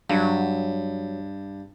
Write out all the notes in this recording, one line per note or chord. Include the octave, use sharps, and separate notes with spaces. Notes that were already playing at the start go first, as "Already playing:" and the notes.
G2 F#3